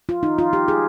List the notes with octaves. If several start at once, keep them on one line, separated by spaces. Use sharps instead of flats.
F4
D#4
F4
G4
G#4